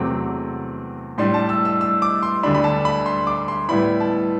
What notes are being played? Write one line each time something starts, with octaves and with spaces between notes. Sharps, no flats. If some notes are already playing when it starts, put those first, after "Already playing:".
Already playing: E2 C3 F#3 A3 C4 D6
A2 G3 D4 C6
A5
E6
E6
E6
D6
C6
D2 D3 G3 D4 B5
B5
A5
B5
C6
D6
C6
A2 G3 B3 E4 B5
A5